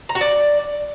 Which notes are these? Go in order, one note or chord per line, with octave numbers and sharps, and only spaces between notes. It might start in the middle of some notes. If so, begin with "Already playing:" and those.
A#5
F#4
D5